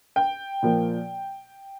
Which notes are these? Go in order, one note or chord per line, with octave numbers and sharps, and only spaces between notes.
G5
A#2 F3 A#3